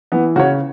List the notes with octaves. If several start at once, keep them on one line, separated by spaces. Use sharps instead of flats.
E3 B3
C#3 F#4 C#5